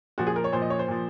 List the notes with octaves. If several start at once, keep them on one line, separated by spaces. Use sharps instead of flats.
A#2 F3 F#4
G#4
A#4
C#5
A#2 F3 C5
D#5
C#5
C5
A#2 F3